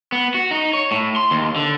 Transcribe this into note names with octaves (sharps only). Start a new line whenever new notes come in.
B3
F#4
D#4
C#5
A2
C6
D#2
D3